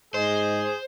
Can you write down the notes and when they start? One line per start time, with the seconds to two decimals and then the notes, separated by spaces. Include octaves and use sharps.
0.14 G#2 G#4 C5 D#5